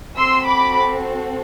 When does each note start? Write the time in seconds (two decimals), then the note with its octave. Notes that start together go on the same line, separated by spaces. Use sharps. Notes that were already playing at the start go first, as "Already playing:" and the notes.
0.17 C4 F#4 A4 C6 E6
0.47 B5 D6